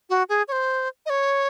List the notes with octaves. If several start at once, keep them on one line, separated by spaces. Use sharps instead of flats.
F#4
G#4
C#5
C5
D#5
C#5